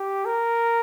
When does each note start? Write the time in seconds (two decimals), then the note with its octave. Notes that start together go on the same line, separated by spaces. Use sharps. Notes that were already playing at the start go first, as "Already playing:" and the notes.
Already playing: G4
0.25 A#4